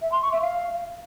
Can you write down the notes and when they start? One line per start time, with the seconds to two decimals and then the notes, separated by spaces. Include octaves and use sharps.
0.01 E5
0.11 C6
0.21 C#6
0.31 E5
0.41 F5